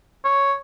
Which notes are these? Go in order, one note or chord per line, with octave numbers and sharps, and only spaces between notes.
C#5